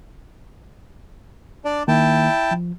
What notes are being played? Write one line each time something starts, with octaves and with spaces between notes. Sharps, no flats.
D4 D5
D#3 A#3 E4 G5 A5
F3